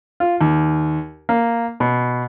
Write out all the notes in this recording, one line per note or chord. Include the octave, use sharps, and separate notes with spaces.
F4
D#2
A#3
B2